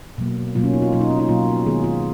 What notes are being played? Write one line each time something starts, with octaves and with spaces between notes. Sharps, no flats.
B2 F#3 A#3
B2 F#3 A#3 F4
C#4
D#4
F4
B2 F#3 A#3 F4
D#4
C#4
D#4
B2 F#3 A#3 F4
D#3 G#3 B3 G#4
F4